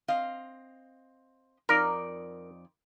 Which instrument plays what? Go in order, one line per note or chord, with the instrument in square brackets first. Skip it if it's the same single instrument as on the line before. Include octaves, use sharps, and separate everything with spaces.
[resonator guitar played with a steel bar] C4 D#5 F5
[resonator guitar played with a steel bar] F2 D#4 D5 [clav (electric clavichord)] A#4